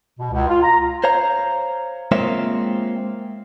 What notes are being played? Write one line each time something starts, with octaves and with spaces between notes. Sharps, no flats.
B2
C#2
F4
A#5
C5 C#5 F5 A#5
G#3 A#3 C4 F4 C#5 E5